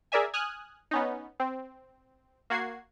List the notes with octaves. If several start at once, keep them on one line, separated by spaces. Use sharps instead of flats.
G#4 A#4 D5 E5 G#5
G#5 D#6 F6 F#6
B3 C#4 D#4
C4
A#3 F#4 G#6 C7